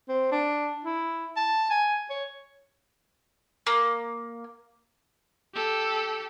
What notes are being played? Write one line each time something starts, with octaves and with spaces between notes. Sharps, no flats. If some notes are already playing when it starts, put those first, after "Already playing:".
C4
D4
E4
A5
G#5
C#5
A#3
G4 A4